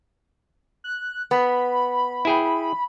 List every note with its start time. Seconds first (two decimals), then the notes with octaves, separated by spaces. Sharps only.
0.84 F#6
1.31 B3 B5
2.25 E4 G#4 G5